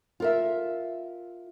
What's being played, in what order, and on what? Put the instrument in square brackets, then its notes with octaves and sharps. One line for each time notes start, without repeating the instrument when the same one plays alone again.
[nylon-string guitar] F4 A#4 E5